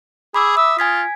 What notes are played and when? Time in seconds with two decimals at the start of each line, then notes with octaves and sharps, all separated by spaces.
0.34 G#4 B5 D6 E6
0.57 E5 D#6
0.79 F4 G#5 G#6 B6